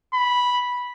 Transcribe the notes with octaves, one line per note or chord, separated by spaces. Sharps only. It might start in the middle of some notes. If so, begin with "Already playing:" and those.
B5